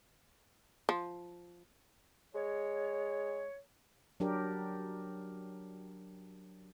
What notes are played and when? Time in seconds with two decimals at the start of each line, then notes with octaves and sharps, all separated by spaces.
0.89 F3
2.34 G#3 C#5
4.20 F#3 D4 G4 A#4